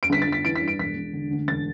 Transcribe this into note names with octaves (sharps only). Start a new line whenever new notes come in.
D7
G1 B6
A6
G1
B6
E3 D7
B6
G2
D7
E1 B6
E1
D3
D2
E1 A6